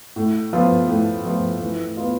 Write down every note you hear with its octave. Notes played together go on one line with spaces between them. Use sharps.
A2
F3 B3 F4
A2
F3 B3 F4
E3
B3 F4